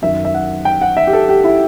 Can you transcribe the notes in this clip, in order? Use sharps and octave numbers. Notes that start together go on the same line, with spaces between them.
F#2 D#3 E5
E5
F#5
G5
F#5
E5
G4
A4
G4
E4